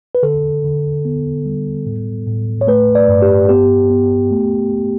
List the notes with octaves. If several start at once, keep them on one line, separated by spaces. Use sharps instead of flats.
B4
D3 A4
D3
B3
G3
A2
A2
C#5
A3 B4
D5
G2
G4
B3 G4
B3
A3